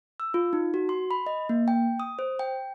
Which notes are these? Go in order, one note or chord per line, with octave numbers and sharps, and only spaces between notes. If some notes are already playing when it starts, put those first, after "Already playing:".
E6
F4
D#4
F#4
C6
B5
D#5
A#3
G5
D#6
C5
G5